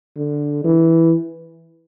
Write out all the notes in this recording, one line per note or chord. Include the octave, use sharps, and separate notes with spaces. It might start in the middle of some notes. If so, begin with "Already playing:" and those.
D3
E3